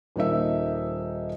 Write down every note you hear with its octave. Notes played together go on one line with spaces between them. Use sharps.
D#1 A#3 D#4 E5